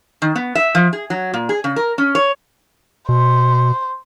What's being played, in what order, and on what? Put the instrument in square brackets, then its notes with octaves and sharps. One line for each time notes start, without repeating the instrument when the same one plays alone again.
[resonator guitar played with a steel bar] D#3
B3
E5
F3
G#4
F#3
A#2
G#4
C#3
A#4
C#4
C#5
[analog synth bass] B2 [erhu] C5